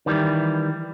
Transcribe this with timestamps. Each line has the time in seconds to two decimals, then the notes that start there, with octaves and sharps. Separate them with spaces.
0.06 D#3 E3 G3